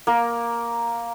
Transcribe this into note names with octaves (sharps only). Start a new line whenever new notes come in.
A#3 A#4